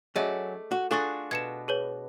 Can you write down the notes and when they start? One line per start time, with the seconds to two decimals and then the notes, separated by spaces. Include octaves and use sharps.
0.16 F#3 A3 C#4 G#4 D5 D#5
0.71 F#4
0.91 D4 F4 F#4 G#4 A4 C#6 A6
1.31 B2 G#6 C#7 E7
1.68 G#4 B4 C#5